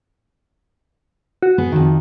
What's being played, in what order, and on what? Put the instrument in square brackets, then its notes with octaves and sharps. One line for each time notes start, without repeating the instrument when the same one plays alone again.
[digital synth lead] F#4
[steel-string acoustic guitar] B3 G#4
F2 D#3